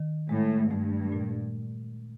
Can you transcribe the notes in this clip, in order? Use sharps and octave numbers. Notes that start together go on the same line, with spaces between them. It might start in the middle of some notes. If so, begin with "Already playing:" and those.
Already playing: D#3
A2 G#3
G2 A3
A#2